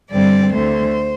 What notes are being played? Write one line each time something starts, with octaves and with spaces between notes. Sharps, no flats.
G2 D3 G3 C4 D5
D2 D3 A3 C5